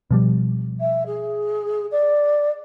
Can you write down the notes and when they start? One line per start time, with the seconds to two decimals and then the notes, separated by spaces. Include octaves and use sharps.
0.11 B2 F3 G3
0.80 E5
1.06 G#4
1.91 D5